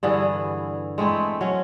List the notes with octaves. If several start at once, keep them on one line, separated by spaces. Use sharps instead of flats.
G2 D3 E3 G#4
G#3 A3 C4 E4
F#3 C#4